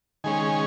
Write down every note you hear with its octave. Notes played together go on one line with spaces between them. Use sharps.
D#3 G#3 C#4 G#5